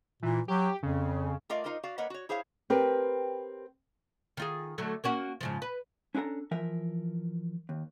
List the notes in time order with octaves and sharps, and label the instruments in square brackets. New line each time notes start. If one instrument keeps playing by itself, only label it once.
[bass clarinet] A#2 [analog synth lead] E3
[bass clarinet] F#3 [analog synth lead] G4
[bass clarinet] F2 [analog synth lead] C#3
[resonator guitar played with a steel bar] A3 F4 A#4 D5 D#5 F5
D#4 F4 A#4 C5 D#5
F#4 D5 F5
A#3 A#4 B4 C#5 D#5 F#5
F#4 C#5
E4 G#4 C5 C#5 F5
[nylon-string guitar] C4 G4 A#4 B4
[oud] D#3 F4 G#4
D3 F#3 A3
A#3 C#4 F#4
G#2 C#3 F3
B4
[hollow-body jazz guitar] C#4 D4 E4 A4 A#5
E3 F3 A#4 E5
D#2